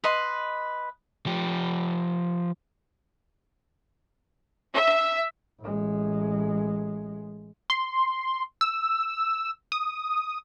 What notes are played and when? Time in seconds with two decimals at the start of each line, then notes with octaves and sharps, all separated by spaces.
0.04 B4 D#5 C6
1.26 F3 G4
4.74 E5
5.60 A1 G#3
7.70 C6
8.61 E6
9.72 D#6